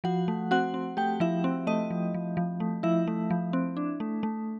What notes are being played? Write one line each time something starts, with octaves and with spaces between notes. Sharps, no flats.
F3 F#4 F#5
A3
C4 F#4 F#5
C4
A3 G4 G5
F3 E4 E5
C4
A3 D#5
F3
F3
F3
A3
F3 E4 E5
A3
F3
C4
D4
A3
A3